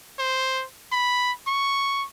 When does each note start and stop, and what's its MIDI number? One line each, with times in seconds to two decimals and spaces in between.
0.19 0.64 72
0.92 1.32 83
1.47 2.05 85